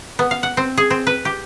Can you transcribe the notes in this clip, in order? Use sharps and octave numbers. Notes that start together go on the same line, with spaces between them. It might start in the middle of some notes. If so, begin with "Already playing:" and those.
B3
F5
F#5
C4
G#4
C4
B4
G4